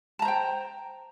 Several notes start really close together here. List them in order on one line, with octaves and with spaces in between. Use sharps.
A5 A#5 C5 G5